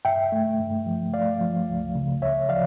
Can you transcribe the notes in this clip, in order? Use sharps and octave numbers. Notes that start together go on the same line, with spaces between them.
G2 E5 G5
A3
G2
F3
A3 D5 F5
F3
C#2
C#3
D2 C#5 E5
F3 D5 F5